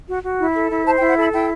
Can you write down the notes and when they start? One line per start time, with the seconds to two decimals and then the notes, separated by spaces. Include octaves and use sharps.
0.09 F#4
0.24 F#4
0.39 E4
0.54 A4
0.71 E4
0.86 C5 A5
0.98 G5
1.01 E4
1.09 F#5
1.17 A4 B5
1.32 E4 G5